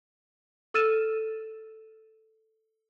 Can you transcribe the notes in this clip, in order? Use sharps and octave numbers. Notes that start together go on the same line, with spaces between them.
A4 E6 F6 A6 D#7 E7